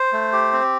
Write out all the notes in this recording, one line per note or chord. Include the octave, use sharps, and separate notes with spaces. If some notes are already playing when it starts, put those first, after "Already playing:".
Already playing: C5
A3
G4
C4